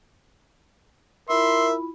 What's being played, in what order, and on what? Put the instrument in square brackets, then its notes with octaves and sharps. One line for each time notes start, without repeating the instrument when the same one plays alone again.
[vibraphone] E4 F4 B5 [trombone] A#4 [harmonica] E5 [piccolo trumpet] C6